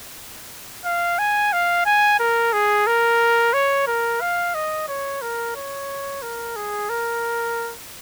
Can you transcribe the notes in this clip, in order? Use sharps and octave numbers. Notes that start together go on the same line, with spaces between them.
F5
G#5
F5
G#5
A#4
G#4
A#4
C#5
A#4
F5
D#5
C#5
A#4
C#5
A#4
G#4
A#4